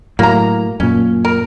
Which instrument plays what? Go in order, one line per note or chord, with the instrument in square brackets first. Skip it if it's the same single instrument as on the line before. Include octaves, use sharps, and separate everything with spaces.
[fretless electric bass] A2 F#3 [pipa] A#3 A#5
[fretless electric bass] F#2 A#2 [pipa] C#4
[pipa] A#4